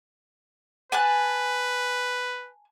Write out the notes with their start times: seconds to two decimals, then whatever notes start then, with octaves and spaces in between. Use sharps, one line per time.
0.92 B4 G#5 A5 F#6